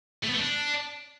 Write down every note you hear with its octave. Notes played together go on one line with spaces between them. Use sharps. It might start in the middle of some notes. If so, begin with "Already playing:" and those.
A3
B3
A3
D4